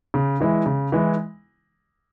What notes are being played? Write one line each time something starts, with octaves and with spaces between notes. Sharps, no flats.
C#3
E3 G#3 E4
C#3
E3 G#3 E4